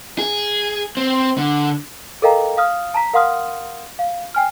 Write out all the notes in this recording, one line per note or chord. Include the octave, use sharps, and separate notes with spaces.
G#4
C4
D3
A4 A#4 D#5 F5 G5 A#5
F5 D#6 F6
A5 A#5 B6
A#4 F5 F#5 C6 D#6 F6
F5
G5 G#5 F6